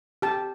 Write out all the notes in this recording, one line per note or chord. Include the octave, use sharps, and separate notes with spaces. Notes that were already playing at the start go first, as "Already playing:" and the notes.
G4 A5